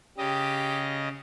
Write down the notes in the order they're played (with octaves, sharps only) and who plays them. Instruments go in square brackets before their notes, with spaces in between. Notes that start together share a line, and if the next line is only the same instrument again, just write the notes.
[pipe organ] C#3 D#5 [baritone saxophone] G4